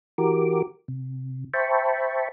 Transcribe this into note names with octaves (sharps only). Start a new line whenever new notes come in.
E3 F#4 G4 A#4 D6
C3
C5 E5 G5 A5 B5 C#6